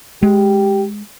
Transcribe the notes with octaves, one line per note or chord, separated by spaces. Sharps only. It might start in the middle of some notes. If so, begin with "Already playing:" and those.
G#3 G4